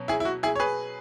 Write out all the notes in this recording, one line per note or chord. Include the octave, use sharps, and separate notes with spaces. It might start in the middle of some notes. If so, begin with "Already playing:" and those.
Already playing: B2 F#3 C#4
E4 G#4
E4
F#4
E4 G#4
C#5
G#4 B4